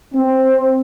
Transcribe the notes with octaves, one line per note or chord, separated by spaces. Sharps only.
C4